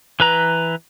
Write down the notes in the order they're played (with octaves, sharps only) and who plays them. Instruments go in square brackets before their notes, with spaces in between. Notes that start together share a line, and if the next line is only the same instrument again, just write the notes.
[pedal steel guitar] E3 B4 A#5